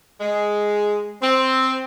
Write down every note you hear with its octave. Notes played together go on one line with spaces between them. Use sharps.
G#3
C4